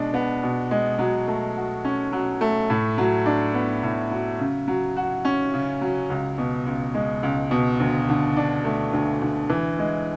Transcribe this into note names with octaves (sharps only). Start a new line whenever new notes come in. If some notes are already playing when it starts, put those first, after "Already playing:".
Already playing: B2 G#3 D4
B3
B2
G#3
F#3
A3
F#4
C#4
F#3
A3
A2
F#3
D4
B3
A2
F#3
C#3
F#3
F#4
C#4
C#3
F#3
C#2
B2
C#2
G#3
C#2
B2
D2
D3
D4
A3
D2
D3
E3
G#3